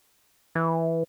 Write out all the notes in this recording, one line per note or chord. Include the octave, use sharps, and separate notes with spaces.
E3